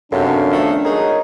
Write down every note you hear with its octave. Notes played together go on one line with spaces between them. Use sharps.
F#2 C3 F#3 B3 C#4 D4 A4 F5
D#3 F3 A3
F#3 G#3 D#4 G#4 A#4 C#5